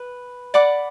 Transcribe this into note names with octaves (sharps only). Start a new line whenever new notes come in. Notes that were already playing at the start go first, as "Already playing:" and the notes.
Already playing: B4
D5 F#5 B5 D6